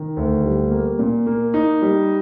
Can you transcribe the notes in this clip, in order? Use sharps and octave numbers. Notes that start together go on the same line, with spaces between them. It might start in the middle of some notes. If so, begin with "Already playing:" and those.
Already playing: D#3
D2
G3
A#3
A#2
A#3
D#4
G3